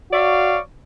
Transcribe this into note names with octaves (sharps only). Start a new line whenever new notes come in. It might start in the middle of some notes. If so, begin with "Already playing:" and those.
F#4 C#5 D5 F5